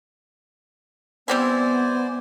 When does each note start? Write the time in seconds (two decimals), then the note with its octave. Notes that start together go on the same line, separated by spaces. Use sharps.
1.28 G3 B3 C4 E4 C5 D5 G#5